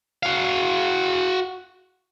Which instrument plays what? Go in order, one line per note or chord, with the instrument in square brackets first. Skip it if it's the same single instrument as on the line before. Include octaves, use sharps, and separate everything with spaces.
[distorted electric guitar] F#4 F5